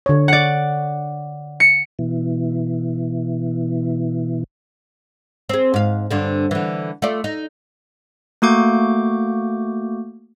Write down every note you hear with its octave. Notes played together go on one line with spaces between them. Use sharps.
D3 C#5
D5 F#5
C#7
B2 E3
C4 G#4
G#2 F5
G2 D3 C4
D3 E3
A3 F4 D5
D#4
A3 A#3 F#4 D6 G6